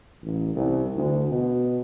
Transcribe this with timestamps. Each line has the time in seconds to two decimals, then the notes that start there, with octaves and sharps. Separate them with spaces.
0.24 A1
0.56 C2
0.97 D2
1.32 B2